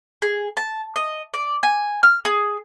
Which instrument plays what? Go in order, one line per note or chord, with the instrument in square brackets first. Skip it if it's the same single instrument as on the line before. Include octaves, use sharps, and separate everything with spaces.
[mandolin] G#4
A5
D#5
D5
G#5
F6
G#4